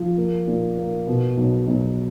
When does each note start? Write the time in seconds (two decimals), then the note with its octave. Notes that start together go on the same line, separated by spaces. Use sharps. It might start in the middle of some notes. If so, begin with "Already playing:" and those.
Already playing: F3
0.17 A#3
0.47 A#2
0.77 A#3
1.07 B2
1.37 B1
1.67 B1